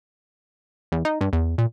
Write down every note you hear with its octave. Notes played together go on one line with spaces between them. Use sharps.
E2
D#4
G2
E2
A#2